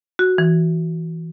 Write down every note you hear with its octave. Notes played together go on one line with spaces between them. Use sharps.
F#4
E3